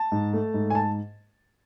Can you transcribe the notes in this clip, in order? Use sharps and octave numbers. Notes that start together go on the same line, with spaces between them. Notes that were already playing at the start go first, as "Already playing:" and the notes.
Already playing: A5
G#2
A3
G#2
G#5
A5